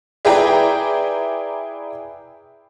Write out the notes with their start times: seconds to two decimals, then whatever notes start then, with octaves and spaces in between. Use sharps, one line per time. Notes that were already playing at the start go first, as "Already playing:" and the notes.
0.25 E4 G#4 B4 D5 G5 A#5